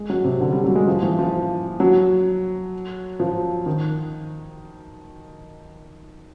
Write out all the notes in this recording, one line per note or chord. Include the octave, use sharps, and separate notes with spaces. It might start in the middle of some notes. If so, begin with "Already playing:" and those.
Already playing: G#3
F#3
C3
D3
G3
F#3
G#3
F3
E3
F3
F#3
F3
D#3